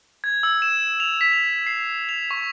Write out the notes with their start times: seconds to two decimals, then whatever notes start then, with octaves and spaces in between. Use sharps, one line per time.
0.24 G#6
0.43 E6
0.62 E7
1.00 F7
1.21 B6
1.33 F7
1.67 C7
2.09 F7
2.31 C#6